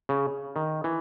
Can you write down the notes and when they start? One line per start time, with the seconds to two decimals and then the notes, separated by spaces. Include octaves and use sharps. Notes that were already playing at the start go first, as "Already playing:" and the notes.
0.09 C#3
0.56 D#3
0.84 E3